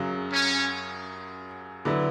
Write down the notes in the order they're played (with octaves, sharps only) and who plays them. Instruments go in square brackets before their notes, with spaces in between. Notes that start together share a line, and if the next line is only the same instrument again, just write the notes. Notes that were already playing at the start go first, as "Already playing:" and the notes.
Already playing: [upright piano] F#2 C#3 F#3
[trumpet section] C#4
[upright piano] D3 F#3 B3 E4